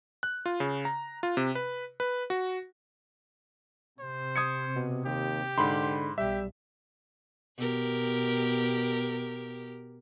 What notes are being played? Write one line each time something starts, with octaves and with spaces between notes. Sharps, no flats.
F#6
F4
C#3
A#5
F4
C3
B4
B4
F#4
C3 C5
D#6 G#6 C#7
B2
D#2 G4
G#2 D3 B5 C6
B1 G3 G4 E5
B2 G4 A#4